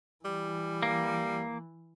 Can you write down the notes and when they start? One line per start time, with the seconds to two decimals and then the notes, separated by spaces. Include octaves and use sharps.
0.25 E3 G3
0.83 A#3